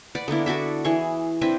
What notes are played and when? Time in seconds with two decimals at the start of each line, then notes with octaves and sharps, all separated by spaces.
0.15 B4 D5 F#5
0.28 D3 A#3 B3 E4
0.46 D4 F#4 A4 E5
0.85 E3 G#4 C#6
1.41 C4 D4 E4 B4